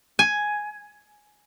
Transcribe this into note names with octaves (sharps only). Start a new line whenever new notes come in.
G#5